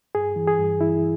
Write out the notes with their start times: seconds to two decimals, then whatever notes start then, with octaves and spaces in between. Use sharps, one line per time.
0.15 G2 G#4
0.36 E3
0.47 G#4
0.59 G2
0.81 E3 E4